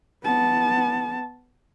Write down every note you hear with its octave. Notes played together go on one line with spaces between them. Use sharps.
B3 A5